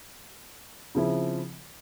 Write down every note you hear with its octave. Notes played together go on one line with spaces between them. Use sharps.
C#3 F3 C4 E4